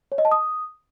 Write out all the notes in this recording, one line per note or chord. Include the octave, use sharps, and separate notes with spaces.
C#5
D#5
A5
D#6